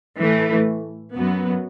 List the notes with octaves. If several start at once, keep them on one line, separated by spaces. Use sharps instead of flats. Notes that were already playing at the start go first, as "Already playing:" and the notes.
A2 E3 A3
F#2 F#3 B3